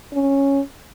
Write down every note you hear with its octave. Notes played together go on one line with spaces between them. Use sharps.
C#4